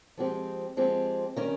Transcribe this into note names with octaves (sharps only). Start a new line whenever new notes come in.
F3 G#3 C4 G4
F3 G#3 C4 G4
D#3 G3 C#4